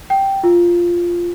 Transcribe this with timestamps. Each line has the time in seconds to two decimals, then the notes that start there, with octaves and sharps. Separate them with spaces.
0.10 G5
0.43 F4